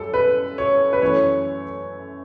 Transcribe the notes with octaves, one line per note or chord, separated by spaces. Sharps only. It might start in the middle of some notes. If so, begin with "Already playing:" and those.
Already playing: F#2 G3 A4
B4
C#5
B4
F#2 E3 A3 C#5